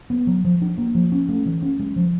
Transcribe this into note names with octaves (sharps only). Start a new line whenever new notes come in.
B3
F#3
F3
D4
A#3
F3
C#4
A3
E3
C#4
G#3
F3